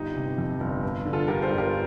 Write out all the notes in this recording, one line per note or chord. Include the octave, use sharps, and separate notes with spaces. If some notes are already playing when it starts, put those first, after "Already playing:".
Already playing: G1 D#4 G4
C3
F2
G1
G1
D3
F4 A4
G2 G4 A#4
A4 C5
G1
G4 A#4